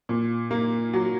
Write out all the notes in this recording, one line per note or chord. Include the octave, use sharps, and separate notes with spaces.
A#2
A#3
F#3